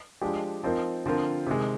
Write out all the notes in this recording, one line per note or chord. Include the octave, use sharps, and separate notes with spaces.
F3 G#3 D4 G4
F3 C4 D#4 A#4
D3 F3 C4 F4 A#4
C3 D#3 G#3